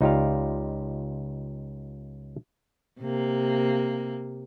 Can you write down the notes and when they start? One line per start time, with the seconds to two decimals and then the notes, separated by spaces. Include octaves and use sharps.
0.01 C#2 D#4 F4 G4 D5 F5
3.01 C3 A#3